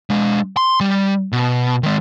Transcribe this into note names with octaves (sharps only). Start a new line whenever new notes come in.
G#3 D4
C6
G3
B2
D#3 G#3